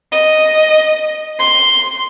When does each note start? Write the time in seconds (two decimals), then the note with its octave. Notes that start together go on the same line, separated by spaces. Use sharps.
0.12 D#5
1.39 C6